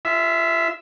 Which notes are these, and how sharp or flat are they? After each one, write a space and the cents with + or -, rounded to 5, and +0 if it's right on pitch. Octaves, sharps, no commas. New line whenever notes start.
F4 -30 E5 +0